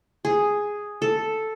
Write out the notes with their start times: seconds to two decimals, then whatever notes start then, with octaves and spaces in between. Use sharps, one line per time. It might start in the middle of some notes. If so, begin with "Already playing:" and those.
0.25 G#4
1.02 A4